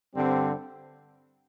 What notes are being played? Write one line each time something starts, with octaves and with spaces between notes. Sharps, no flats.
G2 D3 G3 C4